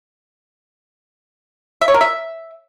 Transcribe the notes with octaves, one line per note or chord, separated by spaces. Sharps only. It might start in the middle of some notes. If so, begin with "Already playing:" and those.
E5
C#5
A#4
E5